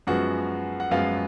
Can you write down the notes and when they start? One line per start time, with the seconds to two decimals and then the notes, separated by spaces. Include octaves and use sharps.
0.07 F#2 F3 G#3 B3 F#4 F#5
0.80 F#5
0.91 F#2 F3 G#3 B3 F4 F5